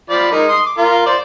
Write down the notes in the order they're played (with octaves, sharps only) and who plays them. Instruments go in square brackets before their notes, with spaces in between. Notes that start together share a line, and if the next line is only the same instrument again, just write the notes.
[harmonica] F3 D5 B5
G#3 D#4 A#4
C6 D#6
D6
F4 A#4
C5 D5